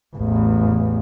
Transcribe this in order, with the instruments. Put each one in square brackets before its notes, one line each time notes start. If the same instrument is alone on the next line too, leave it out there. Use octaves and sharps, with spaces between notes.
[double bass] A1 E2